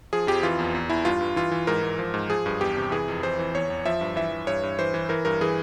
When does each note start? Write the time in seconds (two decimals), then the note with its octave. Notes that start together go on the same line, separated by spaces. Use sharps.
0.13 F3 G#4
0.27 F2 G4
0.43 E3 F4
0.59 E2
0.75 E2
0.90 E2 E4
1.05 G2 F4
1.21 G2
1.36 E3 F4
1.52 E3
1.67 G#2 A#4
1.83 G#2
1.99 F3
2.14 G#2
2.30 F3 G#4
2.46 G2
2.61 E2 G4
2.77 C3
2.92 E3 G#4
3.08 F2
3.23 E3 C5
3.39 E3
3.54 E2 C#5
3.70 E2
3.85 F3 E5
4.01 G2
4.16 E3 E5
4.32 E3
4.47 G2 C#5
4.63 G2
4.79 E3 C5
4.94 E3
5.09 E3 A#4
5.25 G2 A#4
5.41 E3 G#4